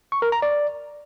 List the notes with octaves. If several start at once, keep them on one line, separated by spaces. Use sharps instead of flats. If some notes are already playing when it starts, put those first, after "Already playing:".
C#6
A#4
A#5
D5